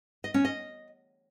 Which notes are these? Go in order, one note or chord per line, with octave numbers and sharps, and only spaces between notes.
D#5
C#4
D#5